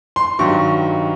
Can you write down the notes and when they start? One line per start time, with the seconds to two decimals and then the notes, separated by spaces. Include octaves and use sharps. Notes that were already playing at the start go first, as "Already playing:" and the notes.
0.16 C6
0.39 G2 D#3 F#3 C#6